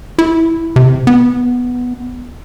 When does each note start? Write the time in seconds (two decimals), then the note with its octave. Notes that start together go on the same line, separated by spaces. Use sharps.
0.18 E4
0.76 C3
1.07 B3